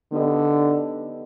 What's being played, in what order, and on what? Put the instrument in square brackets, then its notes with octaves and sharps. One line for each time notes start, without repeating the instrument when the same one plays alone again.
[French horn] D3 [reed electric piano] B3 D#4 G4 B4 D#5